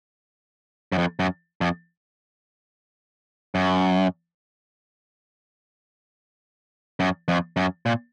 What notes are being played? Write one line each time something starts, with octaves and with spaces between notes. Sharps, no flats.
F#2
F2
F#2
F2
F#2
F#2
F2
F#2
A#2